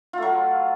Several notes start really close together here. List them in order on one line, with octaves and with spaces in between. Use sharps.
F4 A3 F#3